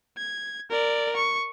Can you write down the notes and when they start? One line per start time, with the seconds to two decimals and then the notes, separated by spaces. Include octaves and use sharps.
0.18 G#6
0.71 A#4 D5
1.16 C#6